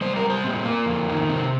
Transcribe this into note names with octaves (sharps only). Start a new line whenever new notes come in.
G3 C5
A#4
G3
C5
A#2 C4
A#2 A#3
F2
D#3
C3 C4